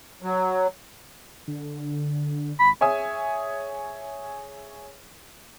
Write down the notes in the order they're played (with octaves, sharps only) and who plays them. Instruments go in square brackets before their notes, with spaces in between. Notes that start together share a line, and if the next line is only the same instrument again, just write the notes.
[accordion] F#3
[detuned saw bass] D3
[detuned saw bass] G#1 [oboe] B5
[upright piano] G#4 C#5 E5 G#5 D#6